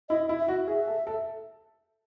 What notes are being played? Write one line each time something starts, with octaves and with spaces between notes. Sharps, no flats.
E4 D#5
E4
E5
F#4
G#4 E5
A4
A4